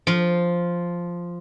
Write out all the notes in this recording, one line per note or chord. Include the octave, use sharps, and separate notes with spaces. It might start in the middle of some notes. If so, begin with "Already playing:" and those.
F3 F4